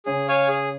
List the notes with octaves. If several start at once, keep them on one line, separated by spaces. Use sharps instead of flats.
C#3 C#4 G#4
C#5 F5 G#5
G#4